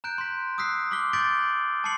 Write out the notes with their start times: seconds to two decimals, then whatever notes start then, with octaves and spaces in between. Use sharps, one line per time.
0.04 A#5 F#6 G6 D7
0.18 C6 B6
0.58 D#6 E6 F#6 B6 C7
0.91 C6 D6 F6 B6 G7
1.13 D6 G6 A6 B6 D7 F#7
1.84 A5 C6 D6 C7 C#7 F#7